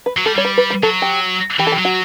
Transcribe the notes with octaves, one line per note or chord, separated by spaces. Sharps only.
B4
F#3
G3 A4
G3 C#5
B4
B4
B4
F#3 A4
G4
E3 G4
A4
G4
F#3
F#4